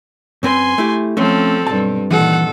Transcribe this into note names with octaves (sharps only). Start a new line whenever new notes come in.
F#2 C4 B4 G#5 C6
A3 E4 G4
F3 A3 C4 C#4 A4
B1 G2 G3 A5
A#2 D#3 E3 A4 F#5